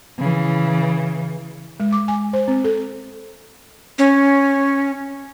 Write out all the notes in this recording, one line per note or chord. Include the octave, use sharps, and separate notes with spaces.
C#3 E3
G#3
D6
G#5
C5
C4
A4
C#4